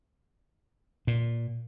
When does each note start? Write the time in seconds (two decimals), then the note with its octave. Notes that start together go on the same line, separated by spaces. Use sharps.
1.07 A#2